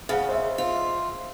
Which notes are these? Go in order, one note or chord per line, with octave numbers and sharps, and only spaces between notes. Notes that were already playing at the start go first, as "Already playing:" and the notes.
C#3 F5 F#5
C5 D#5 E5
F4